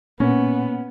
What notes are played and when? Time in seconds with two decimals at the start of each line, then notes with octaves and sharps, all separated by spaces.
0.20 A#2 A#3 B3 C#4